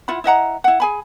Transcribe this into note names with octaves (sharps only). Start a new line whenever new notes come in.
E4 F4 F#5 B5
E4 D#5 F#5 A#5
E4 F#5
G#4 G#5 B5